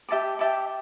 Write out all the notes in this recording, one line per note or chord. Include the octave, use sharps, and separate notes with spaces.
G4 E5 A5 D6
G4 E5 A5 D6